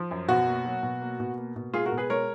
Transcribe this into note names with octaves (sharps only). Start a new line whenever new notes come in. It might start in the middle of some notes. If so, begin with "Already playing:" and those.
Already playing: F3
F#2
B2 F#4
A#3
F#3
B2
A#3
B2
A#3
B2
G#3 F4 G#4
F#4 A#4
B2
G#4 B4
G#3 A#4 C#5